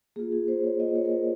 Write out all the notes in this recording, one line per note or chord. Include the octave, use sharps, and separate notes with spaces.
A#3 F4 G#4
G#4
C5
C#5
A#3 F4 D#5
C#5
A#4
C5